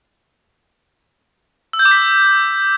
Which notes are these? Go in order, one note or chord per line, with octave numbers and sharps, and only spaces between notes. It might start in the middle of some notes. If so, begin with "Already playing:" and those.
E6
G6
D6
B6